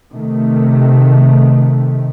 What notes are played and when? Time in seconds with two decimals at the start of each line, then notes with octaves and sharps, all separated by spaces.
0.11 C3 D#3 A3